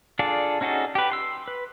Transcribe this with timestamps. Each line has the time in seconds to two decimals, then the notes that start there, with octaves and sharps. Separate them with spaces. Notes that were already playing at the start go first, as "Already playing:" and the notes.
0.19 D4 F4 G#4 A4 D5
0.61 C#4 D#4 F#4 G#4 A4
0.95 G4 B4
1.12 C6 E6
1.48 B4